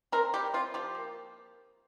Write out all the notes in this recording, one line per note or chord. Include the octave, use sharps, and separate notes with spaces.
C4 A#4
G3 G4
C4 F4
F3 G4
A#3